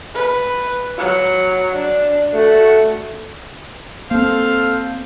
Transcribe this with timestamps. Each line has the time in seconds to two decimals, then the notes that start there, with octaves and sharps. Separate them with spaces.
0.14 B4
0.98 F#3
1.76 D4
2.34 A3 F#4
4.11 A#3 C4 A4 C5 F5